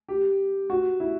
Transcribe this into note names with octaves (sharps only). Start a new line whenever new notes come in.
G4
F#4
E4